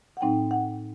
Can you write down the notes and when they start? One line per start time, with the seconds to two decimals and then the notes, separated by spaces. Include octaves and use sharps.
0.17 F#5
0.21 A2 F#3 C4 D#4 G5
0.51 F#5